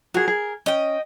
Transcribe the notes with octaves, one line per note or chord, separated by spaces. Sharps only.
F#4 G#4 A#4
G#4
C#4 D#5 G5